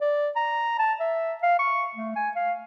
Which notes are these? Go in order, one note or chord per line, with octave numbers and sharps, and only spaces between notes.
D5
A#5
A5
E5
F5
C#6
A3
G#5
F5